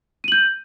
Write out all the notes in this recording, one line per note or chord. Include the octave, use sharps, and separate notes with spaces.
G6 D#7 F#7